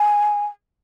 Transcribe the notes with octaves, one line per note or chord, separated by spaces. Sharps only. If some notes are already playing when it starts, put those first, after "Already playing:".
Already playing: G#5